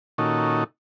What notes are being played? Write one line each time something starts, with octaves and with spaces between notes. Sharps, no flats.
A#2 D#3 C#4 D#4 F#4 A4